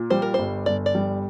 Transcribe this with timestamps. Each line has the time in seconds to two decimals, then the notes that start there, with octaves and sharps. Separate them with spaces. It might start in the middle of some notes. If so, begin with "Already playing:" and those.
Already playing: A#2
0.10 G3 C5
0.22 A#4
0.34 G1 C5
0.66 G1 D5
0.86 D5
0.95 G3